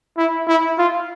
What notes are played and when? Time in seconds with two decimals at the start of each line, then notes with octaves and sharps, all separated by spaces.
0.18 E4
0.48 E4
0.78 F4